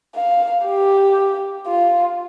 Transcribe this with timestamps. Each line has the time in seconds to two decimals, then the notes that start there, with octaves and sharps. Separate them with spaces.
0.15 F5
0.66 G4
1.67 F4